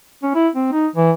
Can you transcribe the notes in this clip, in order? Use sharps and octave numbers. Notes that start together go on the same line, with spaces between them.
C#4
E4
C4
D#4
E3